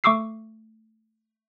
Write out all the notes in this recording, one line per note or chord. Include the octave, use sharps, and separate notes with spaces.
A3 C#6 D6 E6 C7